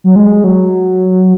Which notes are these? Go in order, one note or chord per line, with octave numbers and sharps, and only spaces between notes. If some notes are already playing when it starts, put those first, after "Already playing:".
F#3
G#3
F#3